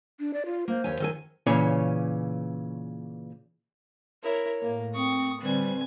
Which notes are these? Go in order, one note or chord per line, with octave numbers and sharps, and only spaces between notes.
D4
D5
F4
A#3 C5
D#2 C#5 G#5
D#3 A4 G#5
A#2 C#3 E3 C#4 C#5
E4 A#4 C#5
A2 A#3
C4 C#6 D#6
D3 G3 C4 B4 G#5